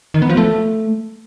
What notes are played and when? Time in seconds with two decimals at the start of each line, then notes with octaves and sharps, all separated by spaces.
0.14 D#3
0.22 B3
0.29 F3
0.37 A3